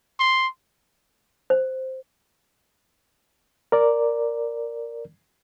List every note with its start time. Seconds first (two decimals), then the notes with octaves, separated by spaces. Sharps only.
0.19 C6
1.50 C5
3.72 A#4 D5